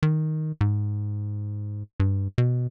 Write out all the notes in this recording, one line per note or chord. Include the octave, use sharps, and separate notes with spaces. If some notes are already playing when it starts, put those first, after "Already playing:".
D#3
G#2
G2
B2